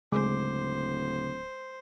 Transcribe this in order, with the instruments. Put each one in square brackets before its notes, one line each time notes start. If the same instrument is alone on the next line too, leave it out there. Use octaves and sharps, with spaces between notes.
[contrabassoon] D1 [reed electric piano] C#3 D6 [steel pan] G#3 [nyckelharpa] C5